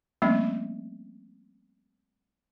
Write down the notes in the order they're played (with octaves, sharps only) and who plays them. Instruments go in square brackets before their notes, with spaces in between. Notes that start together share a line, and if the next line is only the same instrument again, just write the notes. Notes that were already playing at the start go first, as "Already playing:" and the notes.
[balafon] F3 G3 A3 A#3 C4 C#4